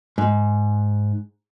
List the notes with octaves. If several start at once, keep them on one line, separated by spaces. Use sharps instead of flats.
G#2